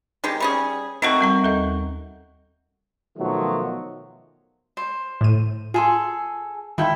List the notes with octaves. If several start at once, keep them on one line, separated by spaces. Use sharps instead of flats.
D#3 G#3 G4
G3 C#4 G#4
D#3 A3 C4 D#4 F#4 A#4
G3 C4 A#5
D#2 A4 D#5
B2 D#3 F3 F#3 A3
C5
A2 D#7
F4 G#4 A4 C6
D#3 E4 F4 A4 G5